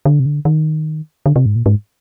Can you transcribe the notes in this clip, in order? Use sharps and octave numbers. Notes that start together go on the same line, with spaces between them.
D3
C3
D3
D#3
D3
C3
G#2
A#2
G#2